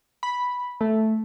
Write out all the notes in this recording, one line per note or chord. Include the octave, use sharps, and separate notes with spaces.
B5
A3